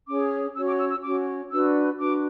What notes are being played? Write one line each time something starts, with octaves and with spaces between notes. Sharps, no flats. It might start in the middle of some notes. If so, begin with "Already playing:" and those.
C#4 G#4 C#5 D6
C#4 F#4 C#5 E6
D6
E6
E6
C#4 F#4 C#5 D6
D4 F#4 B4 E6
D4 F#4 B4 D6